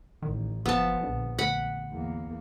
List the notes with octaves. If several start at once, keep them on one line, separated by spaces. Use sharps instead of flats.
A1 D#3
F#1 F3 B3 A5
A#1 D3
D2 F#5 B5
E2 A#3